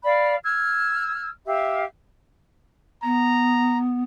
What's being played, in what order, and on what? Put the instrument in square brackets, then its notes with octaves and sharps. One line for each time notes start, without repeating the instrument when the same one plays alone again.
[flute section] D5 F5 B5
E6 F6 G#6
G4 E5 F5
[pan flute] B3 [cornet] A#5